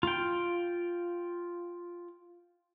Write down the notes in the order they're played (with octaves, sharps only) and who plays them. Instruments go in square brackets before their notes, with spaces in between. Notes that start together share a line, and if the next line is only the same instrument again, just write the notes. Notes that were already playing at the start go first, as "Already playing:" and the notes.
[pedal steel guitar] F4 G5